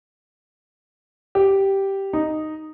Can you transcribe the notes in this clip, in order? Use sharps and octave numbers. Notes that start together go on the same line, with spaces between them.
G4
D#4